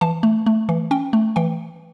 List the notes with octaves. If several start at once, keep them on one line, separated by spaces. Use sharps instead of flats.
E3 A5
A3
A3
E3
C#4 G5
A3
E3 G5